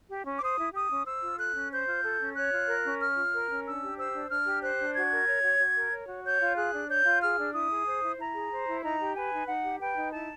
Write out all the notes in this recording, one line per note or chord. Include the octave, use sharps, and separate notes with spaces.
G4
C#4
D6
C5 D#6
E4
G4 D#6
C#4
C5 E6
F4
A4 F#6
C#4
C5 G6
F4
A4
C#4
C#5 F#6
F4
A#4
C#4
C#5 F6
F4
A#4
C#4
D4 E6
G4
C5 E6
D4
D4 F6
G4
C5 F#6
D4
F#4 G#6
A#4
C#5
F#4
F#4
A#4
C#5
F#4
C#5 G6
F4
G#4 F#6
D4
C#5 G6
F4
G#4 F6
D4
E4 D#6
G#4
C5
E4
E4 A#5
G#4
C5
E4
D#4 A#5
G4
B4 G#5
D#4
D#4 F#5
G4
B4 G5
D#4
E4 A5